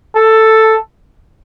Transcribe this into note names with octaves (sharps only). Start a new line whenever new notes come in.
A4